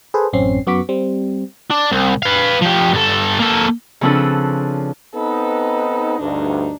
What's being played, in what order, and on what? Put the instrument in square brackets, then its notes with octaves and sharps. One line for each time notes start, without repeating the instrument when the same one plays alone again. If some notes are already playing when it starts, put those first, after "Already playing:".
[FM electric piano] G#4 A4 B4 C5
A1 F#2 C4 C#4 C7
F#2 B3 F#4 C#6 D6 B6
G3 C4
[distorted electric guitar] D4
C2
B4 F5
F3 G4
G2 A4
A#3 A4
[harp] C#3 F3 C4 D4 A4 B4
[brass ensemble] B3 C4 D#4 [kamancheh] A4 B4
[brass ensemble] D2 G2 [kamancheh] D4 D#4